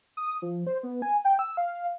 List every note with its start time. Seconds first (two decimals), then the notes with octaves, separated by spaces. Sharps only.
0.17 D#6
0.42 F3
0.67 C5
0.83 B3
1.02 G#5
1.25 G5
1.39 E6
1.57 F5